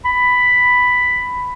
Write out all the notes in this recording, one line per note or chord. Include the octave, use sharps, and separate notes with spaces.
B5